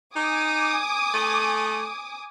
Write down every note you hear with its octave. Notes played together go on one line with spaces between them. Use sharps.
D#4 G#5 D6 D#6
A3